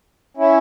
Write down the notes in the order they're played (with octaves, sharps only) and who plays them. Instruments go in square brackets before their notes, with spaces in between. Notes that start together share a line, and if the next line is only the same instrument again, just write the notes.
[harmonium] C#4 E4